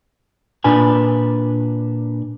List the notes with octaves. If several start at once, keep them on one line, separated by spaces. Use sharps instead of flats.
A#2 D4 B4 G#5